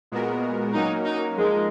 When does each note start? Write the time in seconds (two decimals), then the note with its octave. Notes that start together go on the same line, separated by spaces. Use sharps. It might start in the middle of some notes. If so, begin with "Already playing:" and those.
0.12 A#2 G#3 B3 F#4 A#4
0.74 F#3 A#3 C#4 D#4 F#4 A#4
1.06 D#4
1.37 F3 G#3 A#3 D#4 A#4